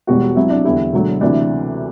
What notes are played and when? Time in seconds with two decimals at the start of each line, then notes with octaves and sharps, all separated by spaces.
0.07 E1 E2 B2 G3 F#4
0.36 C2 C3 F#3 E4
0.50 D4
0.65 E2 D3 G3 E4
0.93 E1 D2 D3 F#3
1.21 D2 C3 E3 D4